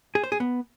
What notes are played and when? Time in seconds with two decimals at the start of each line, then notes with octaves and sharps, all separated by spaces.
0.15 G#4
0.24 C5
0.32 G#4
0.40 B3